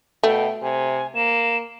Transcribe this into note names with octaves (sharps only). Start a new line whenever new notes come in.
B2 A3 G5
C3 G#5
A#3 E7